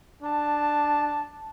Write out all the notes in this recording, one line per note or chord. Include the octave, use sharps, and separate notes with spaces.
D4 A5